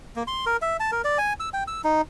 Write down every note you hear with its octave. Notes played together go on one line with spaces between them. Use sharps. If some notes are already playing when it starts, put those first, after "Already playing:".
A#3
C6
A#4
E5
A5
A#4
D5
G#5
E6
G5
E6
D#4